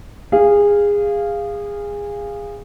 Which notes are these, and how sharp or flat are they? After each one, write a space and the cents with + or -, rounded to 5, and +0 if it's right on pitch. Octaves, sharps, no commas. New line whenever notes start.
G#4 -20 F5 -5